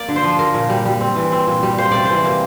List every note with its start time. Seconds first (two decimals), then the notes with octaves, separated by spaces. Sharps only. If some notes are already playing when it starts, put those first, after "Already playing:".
Already playing: A#3 D5
0.08 D3
0.16 C5
0.24 F3
0.39 A#3 A#4
0.54 A#2
0.70 G3
0.85 G3
1.01 C4
1.16 E3
1.32 C4
1.47 A#2
1.63 G3
1.78 A#3 C5
1.91 C3 D5
2.05 E3 C5
2.25 A#3